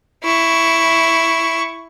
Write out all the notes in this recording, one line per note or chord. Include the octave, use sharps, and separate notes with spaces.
E4 C#6